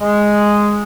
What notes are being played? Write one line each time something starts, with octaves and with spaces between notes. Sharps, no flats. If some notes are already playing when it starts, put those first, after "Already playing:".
G#3